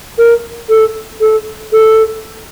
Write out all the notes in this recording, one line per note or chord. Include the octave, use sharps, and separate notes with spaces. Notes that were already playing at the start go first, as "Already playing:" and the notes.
A#4
A4
A4
A4